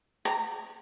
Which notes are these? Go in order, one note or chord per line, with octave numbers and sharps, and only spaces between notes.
A#5